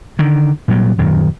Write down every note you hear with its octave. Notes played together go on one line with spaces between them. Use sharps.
D3 D#3
A#2 F#3 G3
D#1 F#2 D#3